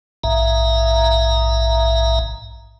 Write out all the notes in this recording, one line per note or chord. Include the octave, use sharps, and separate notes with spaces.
A#1 G#2 E5 A#5